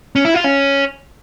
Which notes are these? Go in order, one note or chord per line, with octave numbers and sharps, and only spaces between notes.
C#4
E4
F4
C#4